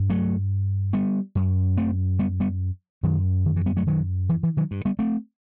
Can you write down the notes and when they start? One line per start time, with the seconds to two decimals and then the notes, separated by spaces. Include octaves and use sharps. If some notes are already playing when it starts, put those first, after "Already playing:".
Already playing: G2
0.10 F#3 A3
0.93 G3 B3
1.35 F#2
1.77 A3 C4
2.19 G3 B3
2.40 G3 B3
3.03 F#2 D#3 F#3
3.45 D#3
3.56 E3
3.66 G3 B3
3.77 F#3 A3
3.87 D#3 F#3
4.29 E3
4.43 E3
4.57 D#3 F#3
4.71 G2
4.85 G3 B3
4.99 A3 C4